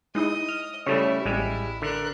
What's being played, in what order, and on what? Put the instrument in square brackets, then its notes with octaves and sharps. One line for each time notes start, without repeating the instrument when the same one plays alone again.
[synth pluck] G#3 D#4 E4 [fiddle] D#5 D#6
[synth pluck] F6
[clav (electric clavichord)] C#3 G3 A3 [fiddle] E4 E5 [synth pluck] A4 C#5
[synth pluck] A1 [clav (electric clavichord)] G3 G#3
[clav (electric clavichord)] D3 [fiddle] A#4 F#6